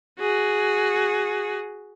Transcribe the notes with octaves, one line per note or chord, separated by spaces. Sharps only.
F#4 G#4